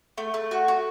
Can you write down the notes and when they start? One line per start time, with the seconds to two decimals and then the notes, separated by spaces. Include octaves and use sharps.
0.18 A3
0.34 A3
0.51 F#4
0.68 F#4